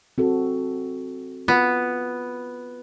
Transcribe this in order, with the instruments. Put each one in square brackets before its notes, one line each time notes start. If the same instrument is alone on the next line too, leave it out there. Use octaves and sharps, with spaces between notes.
[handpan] C4 F#4 A4
[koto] B3 [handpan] F4